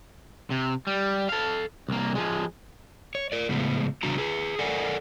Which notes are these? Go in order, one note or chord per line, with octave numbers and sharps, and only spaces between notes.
C3
G3
A4 F5
C2 A#3
F3 G#3
C#5
A#4 D5
A2 C#3 F3 G#3 B3
E2 C#3 G3 D4 F#4 A#5
G#4 B4
A4 A#4 D5 F#5 G#5